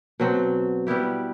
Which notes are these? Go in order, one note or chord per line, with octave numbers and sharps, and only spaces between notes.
B2 F#3 C4
G3 B3 E4 G4